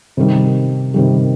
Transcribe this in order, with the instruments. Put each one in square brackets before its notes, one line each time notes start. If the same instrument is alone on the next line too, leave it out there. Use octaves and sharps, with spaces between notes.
[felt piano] C3 D#3 G3
C3 D#3 G3